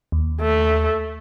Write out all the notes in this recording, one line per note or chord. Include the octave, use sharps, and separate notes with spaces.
D#2
A3